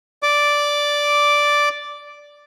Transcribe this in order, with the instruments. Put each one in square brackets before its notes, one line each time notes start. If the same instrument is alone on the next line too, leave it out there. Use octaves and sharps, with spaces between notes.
[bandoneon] D5 D6